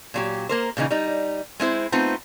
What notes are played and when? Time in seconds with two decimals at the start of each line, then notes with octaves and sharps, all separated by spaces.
0.14 A#2 F#3 G4
0.49 A#3 A#4 C5
0.77 A#2 C#3 E3 D#4
0.91 G3 D#4
1.60 G#3 C4 E4 C5
1.92 A3 B3 C4 D#4 F4